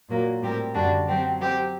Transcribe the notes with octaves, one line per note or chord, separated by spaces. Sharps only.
A#2 F#3 A#3
A2 G3 C4 G4 A#4
F#2 D3 G3 D4 F#4
F#3 C4 G4
F#3 C4 G4 C5